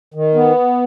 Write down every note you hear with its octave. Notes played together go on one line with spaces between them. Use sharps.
D#3
B3